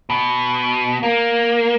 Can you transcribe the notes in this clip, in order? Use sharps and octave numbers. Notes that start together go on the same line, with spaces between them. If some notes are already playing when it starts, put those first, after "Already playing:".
B2
A#3